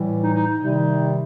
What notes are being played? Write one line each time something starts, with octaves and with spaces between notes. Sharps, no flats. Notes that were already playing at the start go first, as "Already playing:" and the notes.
Already playing: A2 E3 G3
D#4
D#4
D#4
C3 D#3 G3